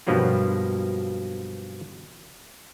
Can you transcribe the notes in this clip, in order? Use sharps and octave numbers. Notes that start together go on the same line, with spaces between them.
G2 B2 F3 F#3 A#3 F4